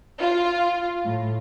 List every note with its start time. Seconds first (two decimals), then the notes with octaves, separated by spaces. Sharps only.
0.19 F4
1.05 A2